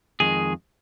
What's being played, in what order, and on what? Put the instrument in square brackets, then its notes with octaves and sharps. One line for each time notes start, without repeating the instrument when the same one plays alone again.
[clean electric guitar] F2 D#3 G#3 G#4